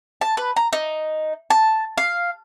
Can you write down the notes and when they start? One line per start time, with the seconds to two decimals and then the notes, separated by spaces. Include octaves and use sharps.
0.21 A5
0.37 B4
0.57 A#5
0.73 D#4
1.50 A5
1.98 F5